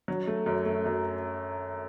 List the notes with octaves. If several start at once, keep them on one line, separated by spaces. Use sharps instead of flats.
F#3
A3
F#2
A3
F#2